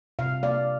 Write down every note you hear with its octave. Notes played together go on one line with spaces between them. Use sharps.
C3 F5
A#3 D5 F5